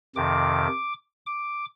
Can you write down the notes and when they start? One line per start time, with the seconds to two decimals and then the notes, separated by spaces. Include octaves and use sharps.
0.16 F2 C3 D#3 D6
1.26 D6